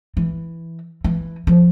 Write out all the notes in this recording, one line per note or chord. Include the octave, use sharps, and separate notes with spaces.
E3
E3
F3